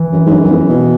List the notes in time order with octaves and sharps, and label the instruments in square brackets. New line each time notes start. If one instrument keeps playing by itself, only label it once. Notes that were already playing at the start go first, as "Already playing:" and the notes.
Already playing: [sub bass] E3
[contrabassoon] F#2
G#2
F#2
F#2
E2
B2